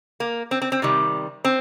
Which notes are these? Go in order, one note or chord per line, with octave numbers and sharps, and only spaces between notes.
A#3
C4
C4
C4
C3 D#3 G3
C4